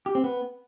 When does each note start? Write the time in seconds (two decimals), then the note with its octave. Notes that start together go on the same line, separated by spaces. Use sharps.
0.06 G4
0.15 C4
0.24 B3